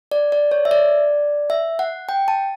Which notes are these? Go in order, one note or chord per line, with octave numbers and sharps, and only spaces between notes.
D5
D5
C#5
E5
D5
E5
F#5
G5
A5